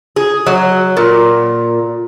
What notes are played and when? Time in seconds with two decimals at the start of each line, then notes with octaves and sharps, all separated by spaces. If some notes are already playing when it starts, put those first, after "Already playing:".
0.16 G#4
0.47 F#3
0.97 A#2